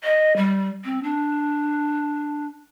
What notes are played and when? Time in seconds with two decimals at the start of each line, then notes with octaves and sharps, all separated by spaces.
0.04 D#5
0.36 G3
0.84 C4
1.03 D4